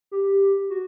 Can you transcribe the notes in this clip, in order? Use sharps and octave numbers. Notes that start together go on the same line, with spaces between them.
G4
F#4